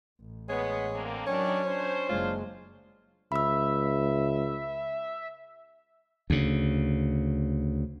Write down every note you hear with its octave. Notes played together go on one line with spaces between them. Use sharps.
A1
G#3 B3 C#5
D3 A#3 C4
D#3 F#3 C#4 D4 C#5
D4 C5
F#1 G#3 F4
C#2 E5 B5 E6
D2 C#3